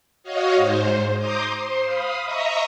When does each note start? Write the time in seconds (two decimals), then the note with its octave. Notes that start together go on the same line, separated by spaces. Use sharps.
0.23 F#4 C#5 D#5 F5
0.55 G#2 C5
1.19 A#5 C6 D6 D#6 G6
1.56 C5 C6
1.85 F5 B5 D#6
2.24 D#5 E5 A#5 C#6 D#6